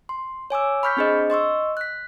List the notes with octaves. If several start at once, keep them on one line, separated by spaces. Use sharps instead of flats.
C6
C#5 G#5 D6 E6
B5 C#6 F6 G6 B6
C4 D4 G#4 C5 D#5
D#5 C6 C#6 E6
F#6 B6